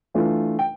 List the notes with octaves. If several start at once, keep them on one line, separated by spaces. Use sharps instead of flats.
E3 A3 D4 F4
G5